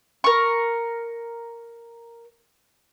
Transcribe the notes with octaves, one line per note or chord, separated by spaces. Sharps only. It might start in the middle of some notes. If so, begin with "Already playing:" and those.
A#4 C#6